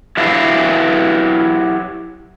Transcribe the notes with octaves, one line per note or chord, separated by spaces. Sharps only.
F#3 E4 G4 B4 E5 F5